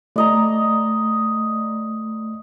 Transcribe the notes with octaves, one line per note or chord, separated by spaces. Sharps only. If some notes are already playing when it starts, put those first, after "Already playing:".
A3 D5 D#5 A#5